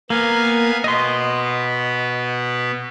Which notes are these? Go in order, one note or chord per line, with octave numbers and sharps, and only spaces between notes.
A#3 B3 F5 G#5
B2 B3 D#5 C6